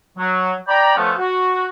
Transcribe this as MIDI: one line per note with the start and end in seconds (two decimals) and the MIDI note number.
0.18 0.54 54
0.68 0.94 74
0.68 0.94 79
0.68 0.94 82
0.68 0.94 83
0.96 1.13 53
0.96 1.13 57
0.96 1.13 59
0.96 1.13 61
1.18 1.66 66